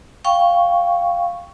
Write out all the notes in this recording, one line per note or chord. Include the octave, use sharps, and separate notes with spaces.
F5 G5 C#6